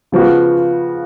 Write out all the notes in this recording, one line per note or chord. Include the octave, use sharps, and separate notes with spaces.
C#3 F3 B3 F#4